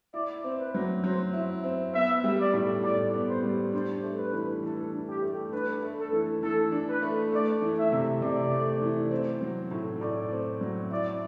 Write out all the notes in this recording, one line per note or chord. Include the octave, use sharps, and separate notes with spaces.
E4 D5
C4
B4
F#3
F#3 C5
E4
C4
B3 E5
G3
D5
A2
A2 D5
B3
C5
G3
D4 C5
A3
B4
E3
E3 A4
D4
G4
A3
D4 B4
A3
A4
E3
E3 A4
D4
B4
A3
A3 D5
E3
E5
C3
C3 D5
A3
E3
C4
F#3
A2
A2 D5
C4
F#3
E4 D5